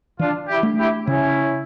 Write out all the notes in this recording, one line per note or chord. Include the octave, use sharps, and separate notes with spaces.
E3 D4 F4
E4 G4
A3 D4
E4 G4
C#3 C#4 E4